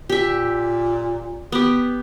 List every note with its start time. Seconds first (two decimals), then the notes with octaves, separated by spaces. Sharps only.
0.09 A#2 G4 E5
1.52 B3 G4